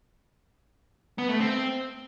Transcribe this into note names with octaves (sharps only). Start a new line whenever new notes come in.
B3
A3
C4